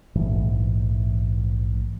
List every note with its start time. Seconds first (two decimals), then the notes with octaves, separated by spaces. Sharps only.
0.15 A#1 G#2 E3 A3